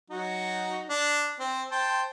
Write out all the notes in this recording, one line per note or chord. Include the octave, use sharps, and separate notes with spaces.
F#3 D#4 F#4
D4
C4
C5 G5 A5